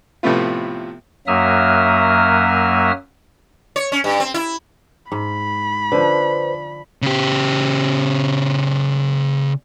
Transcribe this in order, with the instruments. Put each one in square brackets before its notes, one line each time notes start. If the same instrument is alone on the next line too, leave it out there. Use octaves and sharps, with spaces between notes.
[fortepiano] A2 C3 F3 A3 B3 F4
[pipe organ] F#2 F#3 A#3 E5 D#6 F6
[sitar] C#5
C#4
G2
C4
E4
[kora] G#2 [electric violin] B5
[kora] D3 F3 [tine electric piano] B4 C5
[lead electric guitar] C#3 G4